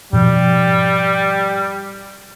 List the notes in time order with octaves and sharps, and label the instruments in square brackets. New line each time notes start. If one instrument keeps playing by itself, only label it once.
[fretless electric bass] G#2 B2 F3 [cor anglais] G3